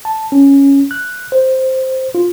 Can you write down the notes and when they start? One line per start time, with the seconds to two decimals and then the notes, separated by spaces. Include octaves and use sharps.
0.05 A5
0.32 C#4
0.91 F#6
1.32 C5
2.15 F4